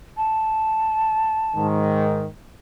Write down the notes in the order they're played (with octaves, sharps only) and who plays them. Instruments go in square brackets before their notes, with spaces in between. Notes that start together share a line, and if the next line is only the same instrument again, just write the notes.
[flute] A5
[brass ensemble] G#2 D#3